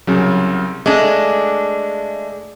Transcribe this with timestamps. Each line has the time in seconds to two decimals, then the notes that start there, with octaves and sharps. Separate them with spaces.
0.07 C2 C#3 F#3
0.86 G#3 A3 D4